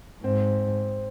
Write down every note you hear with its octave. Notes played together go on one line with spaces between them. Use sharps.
G#2 C4